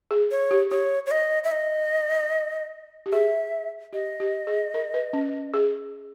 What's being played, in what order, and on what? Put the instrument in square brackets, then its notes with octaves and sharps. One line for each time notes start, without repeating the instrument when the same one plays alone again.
[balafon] G#4
[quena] C#5
[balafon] G4
[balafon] G4 [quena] C#5
[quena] C#5
D#5
E5
D#5
[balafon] G4
[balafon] G#4 [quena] E5
[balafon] G4 [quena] D#5
[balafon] G4
G#4
A#4
B4
C#4
G#4